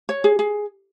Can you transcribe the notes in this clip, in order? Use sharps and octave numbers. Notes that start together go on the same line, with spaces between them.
C#5
G#4
G#4